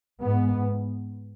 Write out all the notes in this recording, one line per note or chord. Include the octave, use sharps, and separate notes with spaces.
G#2 B3